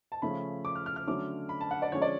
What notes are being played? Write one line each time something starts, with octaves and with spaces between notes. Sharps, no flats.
A5
C#3 F3 A3 C#4 B5
D6
F6
F6
F6
D3 F#3 A3 C#4 D6
B5
A5
F#5
D5
D3 F3 G#3 C#4 C#5
D5